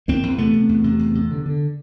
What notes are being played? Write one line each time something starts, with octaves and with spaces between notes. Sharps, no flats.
E2 A#3 C4
E2
C3 A3 B3
C3
E2
C3
E2
C3
D3
D3